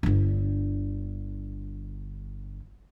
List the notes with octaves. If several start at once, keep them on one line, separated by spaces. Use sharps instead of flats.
G1 D3